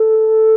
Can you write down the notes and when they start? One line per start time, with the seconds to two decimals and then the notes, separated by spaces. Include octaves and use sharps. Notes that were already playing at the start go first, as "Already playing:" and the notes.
Already playing: A4